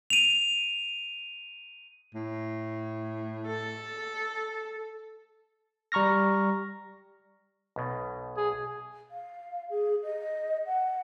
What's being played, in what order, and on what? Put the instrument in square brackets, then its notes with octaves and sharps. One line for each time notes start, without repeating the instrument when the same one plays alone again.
[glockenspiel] D#7 F7
[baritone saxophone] A2
[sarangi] A4
[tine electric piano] G3 A#5 C#6 F6 A#6
[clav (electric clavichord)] B1 B2
[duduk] G#4
[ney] F5
G#4
D#5
F#5